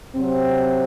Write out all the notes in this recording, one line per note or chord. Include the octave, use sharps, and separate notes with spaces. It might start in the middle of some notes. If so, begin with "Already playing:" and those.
C3 F#3 C4